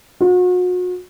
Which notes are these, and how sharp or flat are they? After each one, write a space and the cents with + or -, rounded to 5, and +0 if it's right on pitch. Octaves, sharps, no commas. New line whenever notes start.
F#4 -40